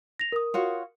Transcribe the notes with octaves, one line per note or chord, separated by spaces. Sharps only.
A#6 F7
A#4 D#6
F4 F#4 C#5